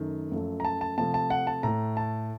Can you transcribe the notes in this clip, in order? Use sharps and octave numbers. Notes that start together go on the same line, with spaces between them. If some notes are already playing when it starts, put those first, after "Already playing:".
Already playing: F#2 D#3 A3
F#2 F3 A3
A#5
A5
A5
C3 F3 A3 A5
A5
F#5
A5
A2 A3 A#5
A5